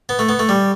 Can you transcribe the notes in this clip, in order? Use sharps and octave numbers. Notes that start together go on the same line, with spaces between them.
B3
A3
B3
A3
G3